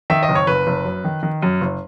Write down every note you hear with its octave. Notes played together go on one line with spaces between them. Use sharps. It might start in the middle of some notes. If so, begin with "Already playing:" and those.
D#3 E5
D#5
F#1
C#5
F#1 B4
F#1
F#2
D#3
D#3
F#2
F#1